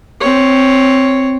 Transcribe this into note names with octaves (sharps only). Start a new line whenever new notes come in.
C4 C#5